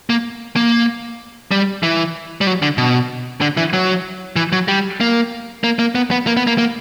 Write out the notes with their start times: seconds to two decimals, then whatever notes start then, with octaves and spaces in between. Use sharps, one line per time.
0.10 A#3
0.56 A#3
1.51 G3
1.83 E3
2.41 G3
2.47 F#3
2.62 D3
2.78 B2
3.41 D3
3.57 E3
3.73 F#3
4.36 E3
4.52 F#3
4.68 G3
5.01 A#3
5.64 A#3
5.79 A#3
5.95 B3
6.11 B3
6.27 A#3
6.37 B3
6.47 A#3
6.58 A#3